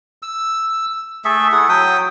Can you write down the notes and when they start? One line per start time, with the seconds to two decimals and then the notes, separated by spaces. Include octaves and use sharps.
0.23 E6
1.25 A3 G#4 A4 E5
1.52 E4 G#4 A4 F#5
1.69 F#3 G5 D#6